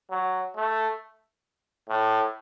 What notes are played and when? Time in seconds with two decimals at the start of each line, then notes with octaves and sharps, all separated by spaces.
0.10 F#3
0.56 A3
1.89 A2